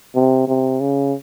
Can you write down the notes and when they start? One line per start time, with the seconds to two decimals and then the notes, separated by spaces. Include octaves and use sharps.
0.15 C3
0.48 C3
0.80 C#3